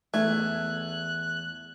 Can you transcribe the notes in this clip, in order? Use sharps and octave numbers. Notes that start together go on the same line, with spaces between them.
E2 A3 G#5 F#6